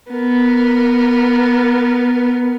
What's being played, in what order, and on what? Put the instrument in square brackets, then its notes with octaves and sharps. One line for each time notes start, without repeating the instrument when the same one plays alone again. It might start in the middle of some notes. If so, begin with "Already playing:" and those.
[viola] B3 A#4